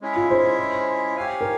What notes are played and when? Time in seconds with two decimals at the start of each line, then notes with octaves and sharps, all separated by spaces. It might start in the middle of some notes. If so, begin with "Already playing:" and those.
0.01 G#3 C#4 E4 G#4 E5
0.16 F4
0.31 C5
1.16 G4 C#5 F5 G#5
1.41 A#4